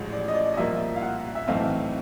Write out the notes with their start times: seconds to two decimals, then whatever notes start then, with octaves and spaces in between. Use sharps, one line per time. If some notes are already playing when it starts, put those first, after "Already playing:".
Already playing: A1 A2 F3 G#3
0.12 D5
0.28 D#5
0.34 D5
0.54 D#5
0.57 C2 A#2 F3 A#3 E5
0.96 F5
1.02 F#5
1.35 E5
1.47 B1 A2 E3 A3 C4 F5